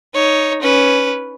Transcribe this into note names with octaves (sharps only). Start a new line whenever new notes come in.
D#4 C#5
C#4 B4